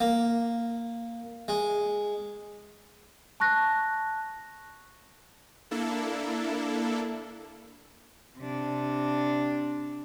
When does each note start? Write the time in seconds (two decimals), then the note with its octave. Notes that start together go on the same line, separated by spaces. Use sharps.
0.01 A#3
1.48 G#3
3.40 A5 C#6 F#6 A#6
5.71 A#3 D4 E4 A4
8.37 C3 D4